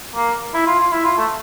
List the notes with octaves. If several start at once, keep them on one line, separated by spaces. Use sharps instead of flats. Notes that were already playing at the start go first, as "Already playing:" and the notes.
A#3
E4
F4
F4
E4
F4
A3